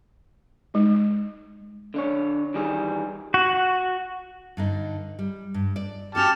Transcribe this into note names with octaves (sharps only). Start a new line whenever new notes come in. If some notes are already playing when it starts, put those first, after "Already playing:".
G#3 D#4
D3 D4 C#5
D#3 E3 G3 G#4
F#4
G2 D3 D#4
G3
G2
D5
C#4 F#4 G4 A4 A5 F6